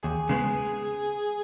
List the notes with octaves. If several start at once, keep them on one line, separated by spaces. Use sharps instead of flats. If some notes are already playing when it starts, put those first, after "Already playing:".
D#2 G#4
C#3 G#3 B3